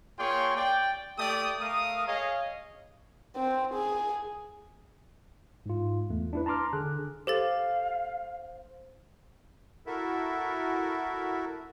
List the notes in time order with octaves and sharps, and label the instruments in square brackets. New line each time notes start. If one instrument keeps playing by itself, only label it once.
[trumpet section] A#3 F4 G#4 C#5 G5 C6
D5 G5
A3 G4 D5 G5 D#6
A3 A#4 F5 D#6
G#4 C#5 D#5 F5
[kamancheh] C4
G#4
[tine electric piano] G#2 F4
E2 A3
D4 E4 B4
A5 A#5 C6 D6 F6
D3 G#4 F#6
[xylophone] G4 A4 A6 [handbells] C5 [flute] F5
[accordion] E4 F#4 A4 A#4 E5